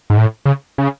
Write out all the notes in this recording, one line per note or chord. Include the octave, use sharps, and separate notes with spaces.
G#2
A2
C#3
C#3